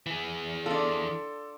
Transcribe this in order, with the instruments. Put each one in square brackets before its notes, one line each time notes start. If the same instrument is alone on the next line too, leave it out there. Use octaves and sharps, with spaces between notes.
[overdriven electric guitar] E3 G#4
[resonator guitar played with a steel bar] D4 F4 [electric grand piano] A4